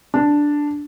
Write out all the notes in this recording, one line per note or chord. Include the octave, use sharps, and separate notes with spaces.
D4